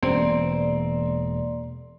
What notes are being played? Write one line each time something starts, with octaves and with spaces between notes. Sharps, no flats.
E1 A#3 C4 D5 C6